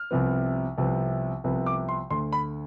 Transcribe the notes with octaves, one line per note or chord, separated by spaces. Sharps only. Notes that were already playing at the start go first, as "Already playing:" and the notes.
Already playing: F6
C2 C3 F3 B3
C2 C3 F3 B3
C2 C3 F3 B3
D6
C6
D2 D3 A3 C6
B5